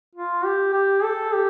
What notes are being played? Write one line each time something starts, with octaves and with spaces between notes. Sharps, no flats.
F4
G4
G4
A4
G4